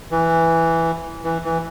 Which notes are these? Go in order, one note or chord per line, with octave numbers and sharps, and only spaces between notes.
E3
E3
E3